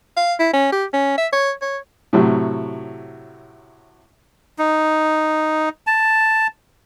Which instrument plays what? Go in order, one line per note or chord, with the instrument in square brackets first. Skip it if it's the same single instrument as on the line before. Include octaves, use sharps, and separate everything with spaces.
[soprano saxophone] F5
E4
C#4
G4
C#4
E5
C#5
C#5
[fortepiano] A2 C3 F#3
[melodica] D#4
A5